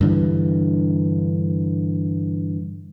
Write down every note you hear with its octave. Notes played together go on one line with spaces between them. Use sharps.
G2 D3 E3